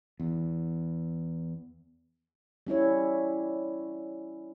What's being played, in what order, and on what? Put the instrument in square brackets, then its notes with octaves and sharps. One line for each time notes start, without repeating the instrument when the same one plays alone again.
[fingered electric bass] E2
[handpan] G3 C#4 E4 C#5